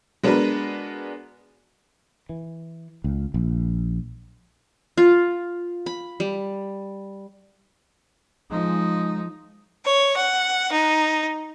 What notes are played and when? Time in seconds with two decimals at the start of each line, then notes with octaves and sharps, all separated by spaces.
0.23 G#3 B3 D4 F#4 A#4 B4
2.29 E3
3.04 C#2
3.34 A#1
4.98 F4
5.86 B5
6.20 G3
8.51 F3 G#3 D#4
9.85 C#5
10.16 F#5
10.72 D#4